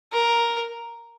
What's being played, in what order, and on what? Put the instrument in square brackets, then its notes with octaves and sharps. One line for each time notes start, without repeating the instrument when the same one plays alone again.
[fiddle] A#4